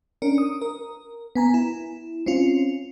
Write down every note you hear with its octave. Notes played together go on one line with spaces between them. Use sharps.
C#4 D4 A#4
D#6
A#4
B3 G#5 A#5
E4
C4 C#4 F4